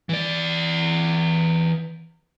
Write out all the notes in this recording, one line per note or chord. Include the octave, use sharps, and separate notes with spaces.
E3 D5